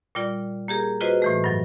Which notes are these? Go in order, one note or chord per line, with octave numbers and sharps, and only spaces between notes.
A#2 G3 F4 D5
A#3 G4 G#4 A#4
F4 F#4 G#4 B4 C5 D#5
A2 E3 A3
G2 F#3